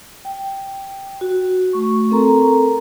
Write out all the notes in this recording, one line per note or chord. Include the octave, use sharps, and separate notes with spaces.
G5
F#4
A3 C#6
C4 A4 A#4 A#5